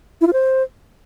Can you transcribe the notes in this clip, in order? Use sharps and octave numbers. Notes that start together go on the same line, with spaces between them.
E4
F4
C5